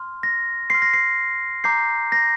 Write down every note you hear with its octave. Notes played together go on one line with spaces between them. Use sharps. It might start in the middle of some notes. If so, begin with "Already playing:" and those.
Already playing: C6 F6
A#6
C6 F6 C7
A#6
C7
A#5 D6 G6 C7
A#6